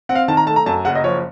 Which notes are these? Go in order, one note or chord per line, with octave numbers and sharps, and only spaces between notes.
C4 F#5
F5
D#3 A5
A#5
A3 A5
A#5
F#2 A5
F#1 F#5
D#5
F3 C#5